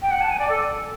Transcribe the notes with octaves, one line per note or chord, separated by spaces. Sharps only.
G5
F#5
A5
G#5
D5
A4